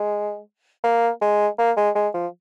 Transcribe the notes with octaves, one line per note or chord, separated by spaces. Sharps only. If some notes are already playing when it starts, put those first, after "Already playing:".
Already playing: G#3
A#3
G#3
A#3
G#3
G#3
F3